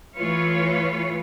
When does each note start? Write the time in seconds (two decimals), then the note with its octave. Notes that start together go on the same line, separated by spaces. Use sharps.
0.17 E3 A3 F4 B4 C#5 F5